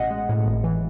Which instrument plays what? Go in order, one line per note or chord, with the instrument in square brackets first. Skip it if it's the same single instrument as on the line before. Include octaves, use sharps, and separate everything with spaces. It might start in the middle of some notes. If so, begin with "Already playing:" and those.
Already playing: [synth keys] A1 B2 D#5 F#5
G#3
A2
G#1
E3